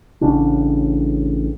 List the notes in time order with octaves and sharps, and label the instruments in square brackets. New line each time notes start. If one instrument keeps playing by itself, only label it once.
[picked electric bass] A1 A2 C#3 D4